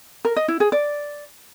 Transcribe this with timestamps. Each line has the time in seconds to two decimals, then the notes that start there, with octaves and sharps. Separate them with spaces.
0.25 A#4
0.36 D#5
0.48 E4
0.60 G#4
0.72 D5